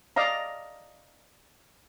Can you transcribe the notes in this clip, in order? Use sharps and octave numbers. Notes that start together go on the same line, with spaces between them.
D5 D#5 F5 A#5